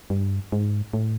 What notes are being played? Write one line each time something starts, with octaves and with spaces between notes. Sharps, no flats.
G2
G#2
A2